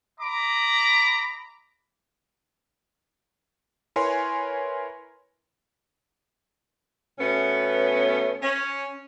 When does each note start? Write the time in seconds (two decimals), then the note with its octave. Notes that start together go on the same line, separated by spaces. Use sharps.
0.21 D#5 A#5 B5 D6
3.96 E4 A#4 B4 C#5 G#5 C6
7.18 B2 A3 B3 C#4
8.41 C#4